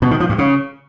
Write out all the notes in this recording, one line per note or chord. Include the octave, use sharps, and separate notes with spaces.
B2
D#3
F3
G2
C#3